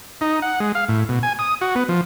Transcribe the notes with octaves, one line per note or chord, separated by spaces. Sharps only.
D#4
F#5
G#3
F5
A2
B2
G#5
D#6
F#4
B3
F3